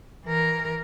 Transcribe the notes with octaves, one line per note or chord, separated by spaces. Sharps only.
E3 A#4